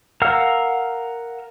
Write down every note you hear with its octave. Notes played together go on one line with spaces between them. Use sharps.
A#4 F5 F#5 E6 F6